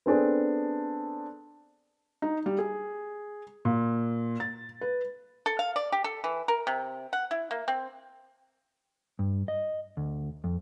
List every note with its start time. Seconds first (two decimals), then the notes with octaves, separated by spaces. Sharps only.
0.06 B3 C4 D4 G#4 A4
2.22 D#4
2.46 G3
2.59 G#4
3.65 A#2
4.40 A6
4.81 B4
5.46 A4
5.59 F5
5.76 D5
5.92 G4
6.04 A4
6.24 E3
6.48 A#4
6.67 C3
7.13 F#5
7.31 E4
7.51 A#3
7.68 C4
9.19 G2
9.48 D#5
9.97 D2
10.44 F2